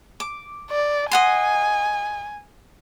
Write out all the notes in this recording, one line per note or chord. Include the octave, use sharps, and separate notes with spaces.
D6
D5
D#5 F#5 G#5 C6